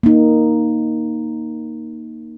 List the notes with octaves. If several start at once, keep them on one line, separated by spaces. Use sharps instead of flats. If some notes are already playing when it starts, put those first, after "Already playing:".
A#3 D#4